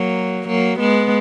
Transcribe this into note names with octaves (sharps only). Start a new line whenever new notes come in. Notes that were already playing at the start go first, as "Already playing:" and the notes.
Already playing: F#3 A#3
F#3 A#3
G#3 B3